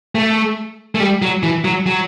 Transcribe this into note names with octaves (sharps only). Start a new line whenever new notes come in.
A3
A3
G3
F#3
E3
F#3
F#3